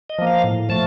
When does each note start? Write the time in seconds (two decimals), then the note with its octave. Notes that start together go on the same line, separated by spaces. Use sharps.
0.09 D#5
0.18 F3 A#3
0.27 F5
0.44 A2
0.69 F3 A3 A5